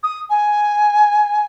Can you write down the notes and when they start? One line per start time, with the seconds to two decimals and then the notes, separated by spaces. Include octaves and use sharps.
0.03 D#6
0.29 G#5